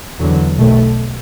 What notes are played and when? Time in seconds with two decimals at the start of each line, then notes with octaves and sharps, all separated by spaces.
0.20 E2 D3 F#3
0.57 B1 B2 A3